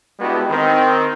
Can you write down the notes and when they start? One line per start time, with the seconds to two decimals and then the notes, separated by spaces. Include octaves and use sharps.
0.19 G#3 B3 D4 E4 F#4 G4
0.50 D#3 C4 D#4